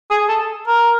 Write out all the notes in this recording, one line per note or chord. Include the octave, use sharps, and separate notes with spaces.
G#4
A4
A#4